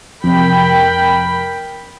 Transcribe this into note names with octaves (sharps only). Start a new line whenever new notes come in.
F2 C3 A#4 G5 B5